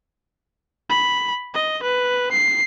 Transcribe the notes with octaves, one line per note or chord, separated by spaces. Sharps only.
B5
D#5
B4
C7